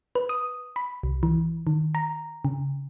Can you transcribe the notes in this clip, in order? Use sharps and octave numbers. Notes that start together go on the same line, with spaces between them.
B4
D#6
B5
C2
E3
D#3
A#5
C#3